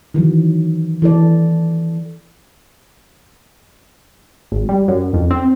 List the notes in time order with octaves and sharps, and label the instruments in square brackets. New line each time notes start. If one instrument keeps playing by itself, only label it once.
[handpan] D#3 E3 F#3
E3 A4 D5
[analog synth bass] G#1
G3
F#2
F2
C4